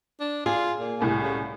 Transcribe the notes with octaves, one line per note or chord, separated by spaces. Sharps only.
D4
F4 G#4
A#2
C2 A2 G#5
C#3